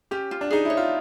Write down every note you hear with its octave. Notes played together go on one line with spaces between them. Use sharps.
C#4 G4
F4
D4
D#4 G#4
E4 C#5
F4